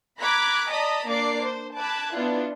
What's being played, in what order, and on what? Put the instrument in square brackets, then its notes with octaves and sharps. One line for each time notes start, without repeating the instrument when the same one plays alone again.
[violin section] A#5 B5 D6 F#6 G#6 B6
D5 D#5 A5 A#5 D#6 B6
A#3 D4 D5 D6 C7
C5
A5 B5 D6 F#6 G#6
B3 D4 E4 F4